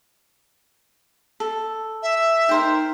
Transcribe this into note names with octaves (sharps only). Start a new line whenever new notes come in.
A4
E5
D#4 A#4 C5 G5